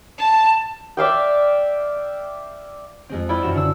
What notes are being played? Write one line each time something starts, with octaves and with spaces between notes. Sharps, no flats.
A5
D5 E5 F5 G5
F2 G#3 C4
E4 D5 F5 G5 G#5 B5
E1 F#2 A#4 F#5 E7
D3 E6